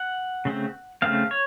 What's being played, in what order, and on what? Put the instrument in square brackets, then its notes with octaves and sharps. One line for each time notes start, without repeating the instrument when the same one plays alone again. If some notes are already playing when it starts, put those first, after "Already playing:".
Already playing: [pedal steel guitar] F#5
C#3 A3 C4
C#3 A3 C4 F5
C#5